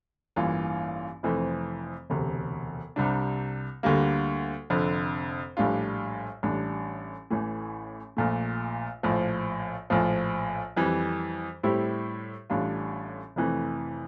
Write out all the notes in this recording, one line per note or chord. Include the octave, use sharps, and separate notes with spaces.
A1 G2 E3 A#3 F4
F1 F2 E3 A3 C4
E1 D2 C3
C2 C3 G3 D4
D2 D3 G3 A#3
F1 F2 D3
A#1 A2 G3 D4 F4
A1 A2 G3 D4
A1 A2 E3 A3
A#1 A#2 A3
A#1 A2 F3
A#1 A2 F3
F2 E3 G3
A2 G3 C4 E4 G4
A1 A2 G3 D4 F4
F1 F2 E3 A3